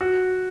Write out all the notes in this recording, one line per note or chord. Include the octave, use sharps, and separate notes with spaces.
F#4